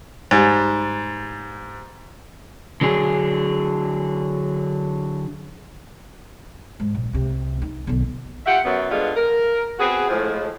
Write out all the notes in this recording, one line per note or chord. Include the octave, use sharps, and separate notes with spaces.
G#2 G3
D3 F#3 D4 G#4
G#2
A#1
C2 C3
D#4
B1 D3
F4 G4 E5 F#5
F#2 B3
G2 D3 G3 G#3 B3 F4
A#4
B3 C4 F#4 G#4
A2 F3 G#3